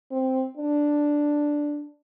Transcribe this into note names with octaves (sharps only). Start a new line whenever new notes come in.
C4
D4